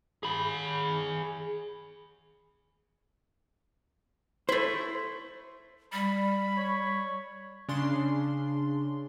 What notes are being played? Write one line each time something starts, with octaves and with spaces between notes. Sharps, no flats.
G#4 B5
A3 E4 C5
G3 B5
C#5
C#3 D4 C6